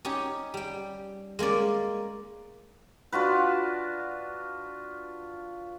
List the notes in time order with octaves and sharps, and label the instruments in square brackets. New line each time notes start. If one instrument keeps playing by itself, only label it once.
[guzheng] C#4 D#4 G4 C#5
G3 G5
G#3 A#3 C#4 D5
[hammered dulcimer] D4 F4 F#4 B4